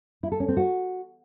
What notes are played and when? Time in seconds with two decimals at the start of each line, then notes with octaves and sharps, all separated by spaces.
0.23 E4
0.32 A4
0.40 C#4
0.48 C4
0.57 F#4